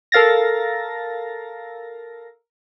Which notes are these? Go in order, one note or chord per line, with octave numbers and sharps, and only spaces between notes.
A4 A#4 F5 A6 A#6